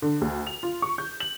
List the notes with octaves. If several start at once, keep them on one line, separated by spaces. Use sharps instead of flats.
D3
D2
F7
F4
C#6
G6
F#7